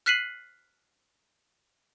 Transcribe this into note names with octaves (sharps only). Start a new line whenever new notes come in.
F6 F#6 B6 C7 D#7 F#7